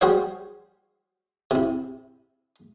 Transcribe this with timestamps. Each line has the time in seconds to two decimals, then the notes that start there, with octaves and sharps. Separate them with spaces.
0.01 G3 F#4 G#4 C5 C#5 F5
1.51 C3 E4